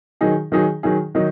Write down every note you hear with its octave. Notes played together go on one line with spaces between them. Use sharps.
D#3 F#3 D#4 G#4
D#3 F#3 D#4 G#4
D#3 F#3 D#4 G#4
D#3 F#3 D#4